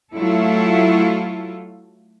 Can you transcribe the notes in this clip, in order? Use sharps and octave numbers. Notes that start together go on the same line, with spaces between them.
F#3 A3 E4 F4 A4